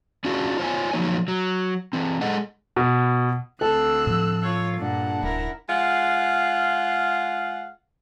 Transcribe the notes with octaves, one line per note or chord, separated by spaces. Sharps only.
C#4 D4 F4 F#4 G#4
F4 C5 C#5 G#5
F3 F#3 A#3 D#4 C#5
F#3
E3 C4
G#3 G#4 A4 D#5 F#5
B2
D2 C4 A4 E6 F#6
A2 F3
F4 C#5
G2 A#2 D4 F#5
D1 E4 A#4
G#3 F4 F5 F#5